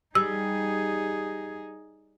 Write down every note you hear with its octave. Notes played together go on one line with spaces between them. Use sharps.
G3 D#4 G#4 E6